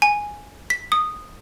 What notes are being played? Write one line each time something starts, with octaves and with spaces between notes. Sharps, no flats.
G#5
B6
D#6